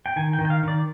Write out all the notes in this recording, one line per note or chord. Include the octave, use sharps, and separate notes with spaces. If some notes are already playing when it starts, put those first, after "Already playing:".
G5
D#3 G#5
G5
D#3
G5
F5
D#3 D5